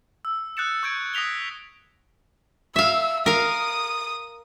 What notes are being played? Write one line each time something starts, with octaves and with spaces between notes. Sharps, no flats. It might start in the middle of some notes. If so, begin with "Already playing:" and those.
E6
D#6 F#6 G6 A6 C#7 E7
C#6 E6 G6 G#6 C#7 D7
D#6 A#6 B6 F7 G7
E5 F5 E6
A#4 F5 D#6